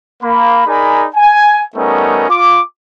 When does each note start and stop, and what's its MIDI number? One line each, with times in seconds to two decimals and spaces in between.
0.23 0.67 58
0.23 0.67 83
0.67 1.07 63
0.67 1.07 68
0.67 1.07 70
0.67 1.07 74
0.67 1.07 80
0.67 1.07 83
1.15 1.63 80
1.76 2.28 55
1.76 2.28 57
1.76 2.28 59
1.76 2.28 61
1.76 2.28 63
1.76 2.28 70
2.29 2.61 65
2.29 2.61 86